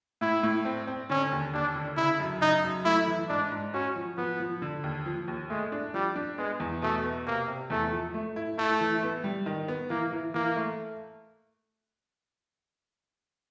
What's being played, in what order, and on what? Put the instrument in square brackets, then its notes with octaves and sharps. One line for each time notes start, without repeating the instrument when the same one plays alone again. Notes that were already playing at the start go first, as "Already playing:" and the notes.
[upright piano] A2 [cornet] E4
[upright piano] A2
C4
C4
[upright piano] D3 [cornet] C#4
[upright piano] D#2
[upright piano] D#2 [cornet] D4
[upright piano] D3
[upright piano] C#3 [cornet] E4
[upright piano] F#2
[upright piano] C#3 [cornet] D#4
[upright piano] F#2
[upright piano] A3 [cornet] E4
[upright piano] E3
[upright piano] G#2 [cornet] D4
[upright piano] G#2
[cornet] C#4 [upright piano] F#4
[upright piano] F3
[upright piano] F3 [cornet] B3
[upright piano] F3
D3
D#2
F3
D#2
[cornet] G#3 [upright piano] A3
[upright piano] D4
[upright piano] F3 [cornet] G3
[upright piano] D4
[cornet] G#3 [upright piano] B3
[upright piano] E2
[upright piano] B2 [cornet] A3
[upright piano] B3
[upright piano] C3 [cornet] A#3
[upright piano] C3
[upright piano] E2 [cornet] A3
[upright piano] F3
A3
E4
[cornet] A3 [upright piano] E4
[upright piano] E3
B3
G3
D#3
B3
[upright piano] E3 [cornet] A#3
[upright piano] E3
[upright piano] E3 [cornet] A#3
[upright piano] A3